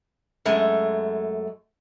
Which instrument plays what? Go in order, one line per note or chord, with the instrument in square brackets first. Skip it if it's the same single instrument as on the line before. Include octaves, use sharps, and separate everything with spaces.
[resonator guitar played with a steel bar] F#2 G#3 A3